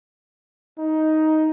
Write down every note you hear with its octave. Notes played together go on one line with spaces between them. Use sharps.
D#4